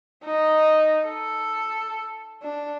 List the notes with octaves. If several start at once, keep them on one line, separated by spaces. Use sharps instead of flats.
D#4
A4
D4